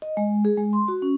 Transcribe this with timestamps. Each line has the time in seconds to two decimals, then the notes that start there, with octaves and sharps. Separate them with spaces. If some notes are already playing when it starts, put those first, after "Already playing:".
0.02 D#5
0.17 G#3
0.45 G#4
0.58 G#3
0.73 C6
0.88 F#4
1.02 C#4